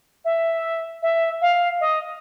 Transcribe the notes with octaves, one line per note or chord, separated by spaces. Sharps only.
E5
E5
F5
D#5